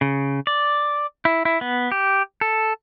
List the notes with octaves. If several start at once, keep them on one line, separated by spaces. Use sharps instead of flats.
C#3
D5
E4
E4
B3
G4
A4